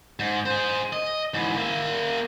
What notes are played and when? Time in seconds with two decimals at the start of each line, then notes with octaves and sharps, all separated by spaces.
0.20 G#2
0.46 G#4 C5
0.93 D#5
1.34 G#2 E3
1.56 A#3 E5